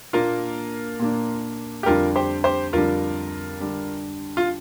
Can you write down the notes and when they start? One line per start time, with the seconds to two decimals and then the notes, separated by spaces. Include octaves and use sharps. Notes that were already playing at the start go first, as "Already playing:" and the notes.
0.13 A#2 A#3 D4 F4 A#4
0.99 A#2 A#3 D4
1.83 G4
1.86 F2 D3 G3 D4 F4 A#4
2.16 G4 C5
2.44 G4 C5
2.73 F2 D3 G3 D4 F4 A#4
3.60 D3 G3 D4
4.37 F4